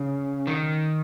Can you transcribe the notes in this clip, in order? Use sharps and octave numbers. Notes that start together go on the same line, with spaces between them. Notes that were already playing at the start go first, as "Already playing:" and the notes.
Already playing: C#3
D#3